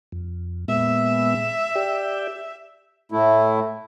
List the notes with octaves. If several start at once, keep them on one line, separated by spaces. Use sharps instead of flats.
F2
A#2 G#3 B3 E5
G4 D5 G5
A2 A3 E4